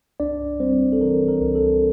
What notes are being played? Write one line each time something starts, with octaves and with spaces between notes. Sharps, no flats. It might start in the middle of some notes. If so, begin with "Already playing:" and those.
C2 D4 D5
G3 C4 C5
A4
E3 A#4
A#4
C2
A4